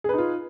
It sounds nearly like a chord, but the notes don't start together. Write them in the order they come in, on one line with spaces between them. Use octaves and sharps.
G#4 B4 D#4 F4